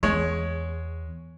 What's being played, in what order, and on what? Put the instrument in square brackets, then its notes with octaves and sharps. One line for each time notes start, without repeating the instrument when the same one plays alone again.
[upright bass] E2 [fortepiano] G#3 C#5